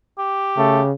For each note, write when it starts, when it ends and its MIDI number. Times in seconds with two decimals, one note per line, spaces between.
0.19 0.87 67
0.57 0.92 49
0.57 0.81 57